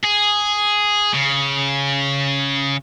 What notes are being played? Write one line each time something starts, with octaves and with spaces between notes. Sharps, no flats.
G#4
C#3